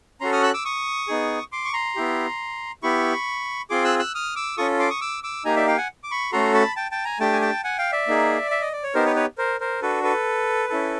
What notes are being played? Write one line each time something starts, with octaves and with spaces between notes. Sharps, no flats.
C#4 F#4 A4 A#5 C6
D#6 F6
E6 F#6
D6 E6
C#6 D#6
B3 D#4 G#4
C6 D6
C#6
A#5 C6
B3 E4 G4
B3 E4 G4 B5 C#6
C4 F4 G#4 C6 D6
E6 F#6
E6 F#6
D#6 F6
D6 E6
C#4 F4 A4 C#6 D#6
C6 D6
C#6 D#6
D6 E6
D6 E6
A#3 D#4 G4 G#5 A#5
D5 E5
F5 G5
F#5 G#5
D6
B5 C#6
A3 C#4 F#4 A4 A#5 C6
A5 B5
G5 A5
G5 A5
G#5 A#5
A3 D4 G4 G5 A5
G#5
G5 A5
F#5 G#5
F5 G5
D5 E5
A#3 D#4 G#4
E5
D#5
D5
C#5
B3 D#4 G4 A#4 C5
B4 C#5
B4 C#5
A#4 C5
A#4 C5
D4 F#4 A4 B4
A4 B4
C#4 E4 A4